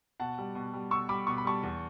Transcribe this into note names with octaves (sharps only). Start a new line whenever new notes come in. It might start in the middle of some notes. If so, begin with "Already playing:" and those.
B2 F#5 A5
G3
B2
G3
B2 C#6 E6
G3 B5 D6
B2 C#6
B5
G3 A5 C#6
E2